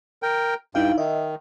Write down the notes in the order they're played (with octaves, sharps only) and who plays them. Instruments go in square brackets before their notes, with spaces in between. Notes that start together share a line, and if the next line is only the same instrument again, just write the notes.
[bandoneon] A#4 G5
[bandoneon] G2 G5 [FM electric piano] D#4 E4 F5
[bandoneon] D#3 [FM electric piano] D#5 E5